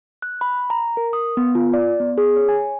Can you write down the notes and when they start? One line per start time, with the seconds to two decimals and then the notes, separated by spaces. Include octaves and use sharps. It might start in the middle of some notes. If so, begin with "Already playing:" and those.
0.22 F#6
0.41 B5
0.70 A#5
0.97 A#4
1.13 D#6
1.37 B3
1.55 F4
1.74 D5
2.00 B3
2.18 G#4
2.37 C#5
2.49 G#5